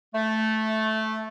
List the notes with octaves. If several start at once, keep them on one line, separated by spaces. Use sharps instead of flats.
A3